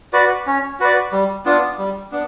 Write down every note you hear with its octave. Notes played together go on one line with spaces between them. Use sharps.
F#4 B4 D5
C#4
F#4 B4 D5
G3
B3 D4 F4
G3
B3 D4